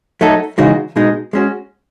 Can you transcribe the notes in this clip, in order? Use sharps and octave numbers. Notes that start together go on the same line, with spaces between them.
F#3 A3 D#4 A4
C#3 E3 G#3 D#4 F#4
B2 G#3 D#4
G#3 C#4 F#4